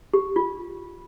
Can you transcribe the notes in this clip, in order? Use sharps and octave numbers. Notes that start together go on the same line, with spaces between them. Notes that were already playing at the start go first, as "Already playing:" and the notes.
G4
F4